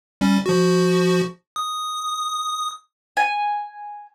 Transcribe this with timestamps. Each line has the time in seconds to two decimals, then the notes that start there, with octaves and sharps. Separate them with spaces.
0.21 G3 C#4
0.46 F3 F#4
1.56 D#6
3.17 G#5